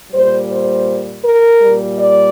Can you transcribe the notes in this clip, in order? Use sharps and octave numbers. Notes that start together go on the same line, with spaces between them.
A#2 G3 C5
C5
A#4
A#2 G3
D5